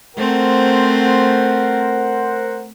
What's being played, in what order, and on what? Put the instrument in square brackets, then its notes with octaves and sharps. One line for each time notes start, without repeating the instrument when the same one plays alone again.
[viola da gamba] A3 C4 [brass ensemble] A#4 C5 F#5